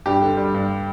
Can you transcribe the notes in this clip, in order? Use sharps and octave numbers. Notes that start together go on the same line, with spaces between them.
G2 G4
D3
G3
G2